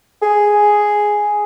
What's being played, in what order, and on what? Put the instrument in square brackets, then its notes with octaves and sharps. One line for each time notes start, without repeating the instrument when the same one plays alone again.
[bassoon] G#4